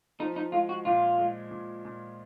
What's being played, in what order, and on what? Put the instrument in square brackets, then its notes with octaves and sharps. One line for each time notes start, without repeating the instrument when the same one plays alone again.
[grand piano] F3 [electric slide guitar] D#4
[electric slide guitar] D#4
[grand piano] G#3 [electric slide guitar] F4
[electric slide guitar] F#4
[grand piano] A#2 [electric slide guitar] F4
[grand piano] G#3
A#2
A#2